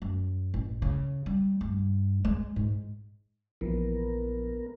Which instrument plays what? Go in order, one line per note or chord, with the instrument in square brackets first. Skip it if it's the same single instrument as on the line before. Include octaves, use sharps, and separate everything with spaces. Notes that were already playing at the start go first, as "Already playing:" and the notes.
[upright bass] F#2
A1
C#3
G3
G2
G#3
G#2
[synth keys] A#1 [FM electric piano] E3 F3 [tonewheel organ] B3 A#4